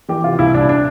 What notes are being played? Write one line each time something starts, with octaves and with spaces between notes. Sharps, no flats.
E3 G4
C3 F4
C2 E4
C2 D4
D4